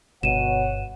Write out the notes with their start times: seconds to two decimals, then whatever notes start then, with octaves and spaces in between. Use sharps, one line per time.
0.23 G1 B2 C#5 F#5 D#7 E7